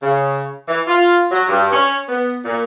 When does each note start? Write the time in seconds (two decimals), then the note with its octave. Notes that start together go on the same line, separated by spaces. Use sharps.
0.03 C#3
0.68 E3
0.88 F4
1.32 F#3
1.49 G2
1.72 C#4
2.09 B3
2.45 A#2